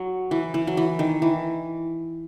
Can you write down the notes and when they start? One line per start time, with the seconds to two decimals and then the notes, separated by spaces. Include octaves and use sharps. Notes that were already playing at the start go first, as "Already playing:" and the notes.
Already playing: F#3
0.31 E3
0.54 E3
0.67 F#3
0.77 E3
0.99 D#3
1.22 E3